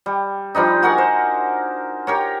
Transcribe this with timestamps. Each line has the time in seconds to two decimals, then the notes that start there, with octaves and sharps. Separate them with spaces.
0.06 G3
0.55 F3 G3 D4 D#4
0.82 F#4 A#4 F#5 G#5
0.98 C5
2.07 G4 A#4 C#5